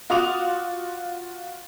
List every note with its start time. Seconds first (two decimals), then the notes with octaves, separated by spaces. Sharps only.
0.10 F4 F#4 D6 D#6 F7